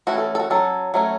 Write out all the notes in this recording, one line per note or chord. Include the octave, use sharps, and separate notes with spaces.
E3 A3 C#4 F#4
A4
A4
F#4
F#3 C#4 A4
F#3 A3 C#4